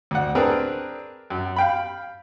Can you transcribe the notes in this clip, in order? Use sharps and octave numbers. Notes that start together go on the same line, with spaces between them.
D2 F#5
C4 D4 G#4 A#4 B4
F#2
F5 G5 B5